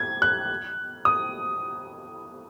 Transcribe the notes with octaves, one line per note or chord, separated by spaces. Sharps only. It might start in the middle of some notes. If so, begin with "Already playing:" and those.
Already playing: G#6
F#6
D#6